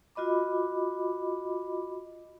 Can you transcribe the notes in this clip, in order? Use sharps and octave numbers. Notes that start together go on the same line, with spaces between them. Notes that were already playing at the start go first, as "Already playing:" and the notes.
F4 F#4 D#5 B5 D6